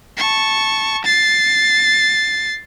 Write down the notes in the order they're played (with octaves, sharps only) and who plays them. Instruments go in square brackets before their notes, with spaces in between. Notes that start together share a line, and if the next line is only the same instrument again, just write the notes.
[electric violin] A5 C#6
A6 C7